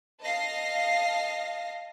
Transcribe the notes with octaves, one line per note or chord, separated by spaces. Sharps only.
D#5 F5 A5 A#6 C7